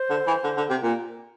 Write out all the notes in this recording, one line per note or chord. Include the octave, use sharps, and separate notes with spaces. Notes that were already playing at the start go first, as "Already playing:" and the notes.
Already playing: C5
D3
E3
D3
D3
C3
A#2